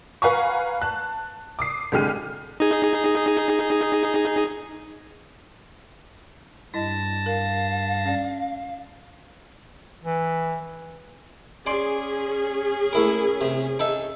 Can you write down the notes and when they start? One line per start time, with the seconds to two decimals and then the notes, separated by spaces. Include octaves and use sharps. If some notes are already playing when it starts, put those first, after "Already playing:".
0.22 B4 F5 F#5 G#5 A#5 C#6
0.82 A5 F#6
1.59 D6 D#6 C7
1.92 C2 D3 G#3 G4 F6 D#7
2.60 D#4 G#4
6.74 G2 E4 D#5 A5 A#6
7.26 A#4 F5
8.06 C#4 D5
10.04 E3
11.66 C#4 G#4 D5 G#5 C6
12.93 A3 E4 A#4
13.41 C3
13.79 D#4 A4 E5